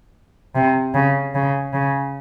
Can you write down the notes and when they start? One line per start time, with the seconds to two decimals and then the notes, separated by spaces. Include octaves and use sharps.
0.55 C3
0.95 C#3
1.35 C#3
1.73 C#3